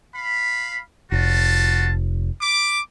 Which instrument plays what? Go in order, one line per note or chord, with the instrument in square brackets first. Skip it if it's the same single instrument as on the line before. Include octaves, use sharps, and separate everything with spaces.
[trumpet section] F5 B5
[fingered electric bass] F1 [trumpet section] F4 F#4 A5
[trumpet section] B5 D6